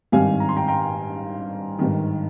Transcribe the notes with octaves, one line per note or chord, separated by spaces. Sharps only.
G#1 G2 D#3 G3 C4 F5 G#5
A#5
C6
G5 A#5
G5 A#5
G#1 G2 D#3